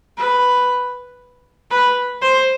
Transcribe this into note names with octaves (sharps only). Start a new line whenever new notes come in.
B4
B4
C5